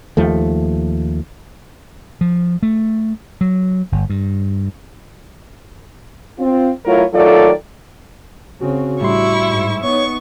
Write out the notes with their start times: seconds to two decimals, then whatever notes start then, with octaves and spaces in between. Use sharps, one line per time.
0.17 D#2 F3 A3
2.21 F3
2.63 A3
3.41 F#3
3.92 G1
4.10 G2
6.39 C4 F4
6.85 F#3 A3 E4 F4 A#4 C#5
7.14 D#3 F#3 A3 F4 A4 D5
8.61 C#3 C4 F#4
9.01 A2 G3 D4 E4 C6 C#6
9.50 G#2
9.83 B3 D#4 C#5 C#6